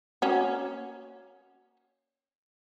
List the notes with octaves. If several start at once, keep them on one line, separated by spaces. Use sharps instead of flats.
A#3 C#4 F#4